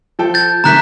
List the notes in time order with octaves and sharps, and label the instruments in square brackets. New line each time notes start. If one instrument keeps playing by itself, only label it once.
[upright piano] F3 A4 G5
[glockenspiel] G6 A6
[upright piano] C3 D#3 A3 [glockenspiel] A#5 F#6 B6